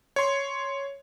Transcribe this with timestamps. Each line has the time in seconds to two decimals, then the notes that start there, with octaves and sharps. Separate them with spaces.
0.16 C#5 C6